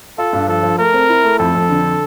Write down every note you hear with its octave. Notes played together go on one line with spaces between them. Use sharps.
F4 A4
G2
F3 A4
F3
A3 A#4
C4
E4
A3
F2 A4
F2
D3